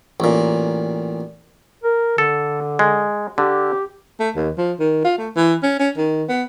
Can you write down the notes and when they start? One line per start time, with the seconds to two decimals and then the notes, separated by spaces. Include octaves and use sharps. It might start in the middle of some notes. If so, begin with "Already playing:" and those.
0.20 A1 A#2
1.83 A#4
2.18 D3 A4
2.79 G#3
3.38 D3 G4
4.20 A3
4.35 D#2
4.57 F3
4.80 D#3
5.05 F4
5.18 A3
5.36 E3
5.63 C#4
5.79 C#4
5.97 D#3
6.29 B3